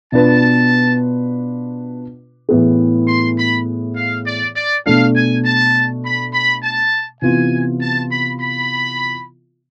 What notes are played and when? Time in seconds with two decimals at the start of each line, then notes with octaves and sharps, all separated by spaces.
0.12 B2 B3 D4 F4 B4 A5
2.49 A2 E3 B3 E4 G#4
3.08 C6
3.38 B5
3.96 F5
4.26 D5
4.55 D5
4.85 B2 A3 D4 F5
5.15 G#5
5.44 A5
6.04 B5
6.33 B5
6.62 A5
7.21 C3 E3 B3 F4 G#5
7.81 A5
8.11 B5
8.39 B5